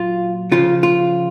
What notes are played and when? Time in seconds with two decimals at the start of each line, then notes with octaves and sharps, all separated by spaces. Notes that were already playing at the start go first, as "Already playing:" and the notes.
Already playing: A#2 F#3 F4
0.52 C#3 F3 F4
0.83 F4